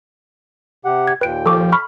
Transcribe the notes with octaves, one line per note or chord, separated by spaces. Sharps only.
C3 G4 F#5
G#6
D#2 A#2 B4 G5 D7
F3 A4 C#6 D6
B5 C#6 F6